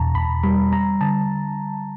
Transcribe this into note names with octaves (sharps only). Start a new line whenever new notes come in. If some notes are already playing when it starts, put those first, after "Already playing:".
Already playing: E2 B2 A5 A#5
E2 B5
G3 B5
G3 A#5
D3 A5